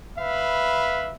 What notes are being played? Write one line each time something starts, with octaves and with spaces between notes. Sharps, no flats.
B4 E5 F5 B5